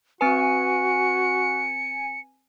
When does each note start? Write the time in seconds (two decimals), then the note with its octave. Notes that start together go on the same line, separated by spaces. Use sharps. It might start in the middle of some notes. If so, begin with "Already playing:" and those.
0.21 C4 F#4 B4 G#5 C#7